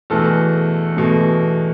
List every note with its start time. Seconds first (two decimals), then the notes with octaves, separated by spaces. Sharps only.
0.10 E2 B2 A3 A4
0.97 E2 B2 A3